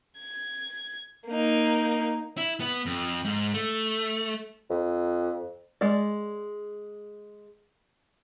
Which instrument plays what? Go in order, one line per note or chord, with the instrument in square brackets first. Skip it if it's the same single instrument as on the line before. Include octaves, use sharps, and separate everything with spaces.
[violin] G#6
A#3 D#4
[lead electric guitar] E4
B3
F2
G#2
A3
[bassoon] F2
[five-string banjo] G#3 D5